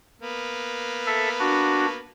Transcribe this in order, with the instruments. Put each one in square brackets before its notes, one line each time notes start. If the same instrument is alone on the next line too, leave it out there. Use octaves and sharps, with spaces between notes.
[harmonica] A#3 B3
[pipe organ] A4 E5
D4 F#4